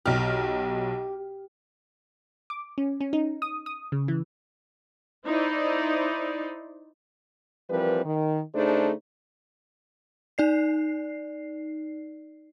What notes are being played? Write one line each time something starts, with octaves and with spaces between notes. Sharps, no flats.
B1 G4 F6
D6
C#4
C#4
D#4
D#6
D#6
C#3
E3
D#4 E4 C5 D5
E3 F3 G3 C4 A#4 B4
D#3
C#3 A3 D4 D#4 G#4 C5
D#4 D5 C7